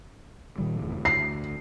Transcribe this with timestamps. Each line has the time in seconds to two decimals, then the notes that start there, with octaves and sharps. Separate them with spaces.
0.58 A#2 D#3 G3
0.78 F#1 E2 A2
1.05 D2 C7